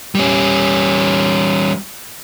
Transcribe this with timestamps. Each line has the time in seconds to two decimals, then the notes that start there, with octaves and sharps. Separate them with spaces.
0.15 G3 C#4